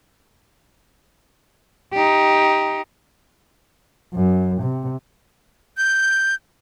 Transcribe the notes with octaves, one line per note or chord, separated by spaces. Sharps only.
D#4 G4
F#2
C3
G6